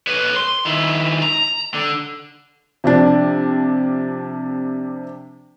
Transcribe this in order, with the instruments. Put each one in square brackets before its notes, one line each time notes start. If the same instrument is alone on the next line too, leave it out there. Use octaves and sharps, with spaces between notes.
[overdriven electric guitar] B4 C#5
C6
D#3 E4
A#5
D3
[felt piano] C3 F3 D4